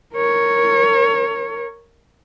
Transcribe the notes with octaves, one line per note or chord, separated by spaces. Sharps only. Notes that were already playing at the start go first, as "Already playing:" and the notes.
A#4 C#5